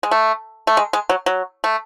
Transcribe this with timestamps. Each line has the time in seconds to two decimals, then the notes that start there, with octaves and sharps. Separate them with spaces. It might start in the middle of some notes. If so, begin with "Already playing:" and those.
0.03 G#3
0.11 A3
0.67 A3
0.77 G#3
0.93 G#3
1.09 F#3
1.26 F#3
1.64 A3